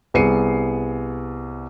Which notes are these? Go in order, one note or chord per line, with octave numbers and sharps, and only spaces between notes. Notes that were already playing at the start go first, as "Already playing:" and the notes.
C2 B3 G#4 C7 C#7 D#7